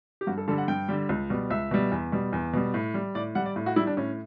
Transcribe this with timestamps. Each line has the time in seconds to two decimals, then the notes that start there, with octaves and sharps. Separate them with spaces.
0.21 G4
0.27 G2 F#4
0.38 A4
0.48 D3 G3 A4
0.58 F#5
0.68 G2 G5
0.88 D3 G3
1.09 C#2
1.30 B2 G3
1.50 C#2 E5
1.71 B2 G3
1.91 E2
2.12 B2 G3
2.33 E2
2.53 B2 G3
2.74 A2
2.94 G3
3.15 A2 D5
3.35 G3 F#5
3.46 D5
3.56 A2
3.66 F#4
3.76 G3 E4
3.87 D4
3.97 A2 C#4